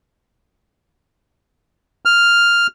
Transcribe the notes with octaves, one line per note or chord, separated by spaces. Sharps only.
F6